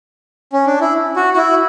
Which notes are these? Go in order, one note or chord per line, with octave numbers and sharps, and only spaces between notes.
C#4
D4
E4
F#4
F#4
E4